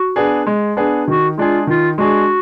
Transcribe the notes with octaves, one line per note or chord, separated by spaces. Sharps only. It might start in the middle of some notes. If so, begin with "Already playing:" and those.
Already playing: F#4
B3 D4 G#4
G#3
B3 D4 G#4
D#3 F#4
G#3 D4 F4 G#4
D#3 F4
G#3 D4 F#4 G#4